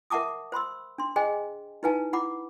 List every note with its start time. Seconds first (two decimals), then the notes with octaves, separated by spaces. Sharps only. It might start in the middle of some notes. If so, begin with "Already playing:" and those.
0.10 A#4 E5 F#5 A5 D6 D#6
0.52 C5 B5 C6 E6
0.98 D4 C6
1.16 G#4 C5 D#5 G5 G#5
1.83 D#4 E4 B4 F5 G#5 A5
2.13 E4 F#5 B5 D6